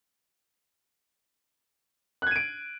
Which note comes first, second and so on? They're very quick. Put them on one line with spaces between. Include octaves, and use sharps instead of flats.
F#6 G#6 D#7 D7